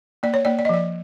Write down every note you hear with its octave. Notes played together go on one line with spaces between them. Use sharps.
A#3 D5
C#5
A#3 D5
D5
D#5
F3 D5